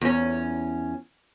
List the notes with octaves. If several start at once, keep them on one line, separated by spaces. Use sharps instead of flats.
E2 C#4